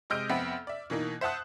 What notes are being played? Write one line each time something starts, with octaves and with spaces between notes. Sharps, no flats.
C3 G#3 D#5 F6 G6 D7
F2 B3 C4 E5 F#5 B5
D5 E5
B2 E3 A#3 D#4
C5 E5 F#5 A5 D#6 F#6